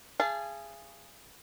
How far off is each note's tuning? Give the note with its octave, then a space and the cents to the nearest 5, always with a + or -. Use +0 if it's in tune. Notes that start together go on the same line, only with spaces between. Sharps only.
G#4 -10 F5 -35 A5 -15